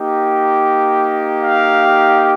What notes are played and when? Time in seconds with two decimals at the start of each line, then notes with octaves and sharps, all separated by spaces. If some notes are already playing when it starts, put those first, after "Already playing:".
Already playing: A#3 D#4 G4
1.42 F5